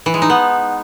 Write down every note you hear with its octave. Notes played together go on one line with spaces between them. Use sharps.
E3
G#3
D#4
B3